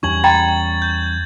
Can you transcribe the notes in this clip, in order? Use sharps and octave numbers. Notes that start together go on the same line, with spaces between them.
E2 G3 C#4 C#6 G#6 F#7
G5 A#5 B5 G#6 A6
G6